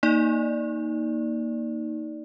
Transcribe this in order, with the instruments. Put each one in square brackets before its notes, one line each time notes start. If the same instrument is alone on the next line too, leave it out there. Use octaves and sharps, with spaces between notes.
[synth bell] A#3 D#4 D5